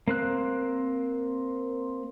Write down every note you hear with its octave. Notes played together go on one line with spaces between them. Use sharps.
A#3 C4 F#6